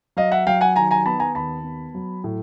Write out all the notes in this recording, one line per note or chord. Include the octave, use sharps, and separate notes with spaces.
F#3 D#5 F5
E5 F#5
F#3 F5 G5
F#5 G#5
D#3 G#5 A#5
G#5 A#5
B3 A5 B5
G#5 A#5
D#2 A5 B5
B3
F#3
A2